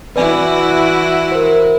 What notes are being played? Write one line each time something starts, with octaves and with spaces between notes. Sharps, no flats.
E3 E4 F#4 B4 D5 G#5
A#4 C5